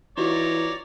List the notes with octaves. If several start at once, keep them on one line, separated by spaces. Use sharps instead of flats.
E3 D#4 F4 F#4 C#5 D5 A#5